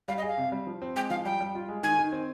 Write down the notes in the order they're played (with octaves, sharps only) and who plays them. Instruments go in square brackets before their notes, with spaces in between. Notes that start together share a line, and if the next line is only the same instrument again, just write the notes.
[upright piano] G3 [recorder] F5
[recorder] D#5
[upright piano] G#4
[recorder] F5
[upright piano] C3
G3
F3
C4
[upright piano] G#3 [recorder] G5
[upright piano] F3 [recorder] F5
[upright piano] G3 [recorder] G5
[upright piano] G3
F4
G#3
[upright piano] D#3 [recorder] G#5
[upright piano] D#3
C4